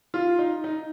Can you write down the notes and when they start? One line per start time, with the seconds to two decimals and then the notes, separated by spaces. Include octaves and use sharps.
0.14 F4
0.39 D#4
0.64 D#4